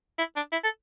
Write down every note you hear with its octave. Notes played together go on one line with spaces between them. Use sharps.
E4
D4
E4
A4